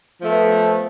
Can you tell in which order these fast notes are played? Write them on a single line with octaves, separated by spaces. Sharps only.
F3 A3 B3